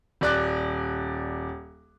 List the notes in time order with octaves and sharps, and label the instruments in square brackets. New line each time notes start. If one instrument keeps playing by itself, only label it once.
[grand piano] D#1 D5 F#6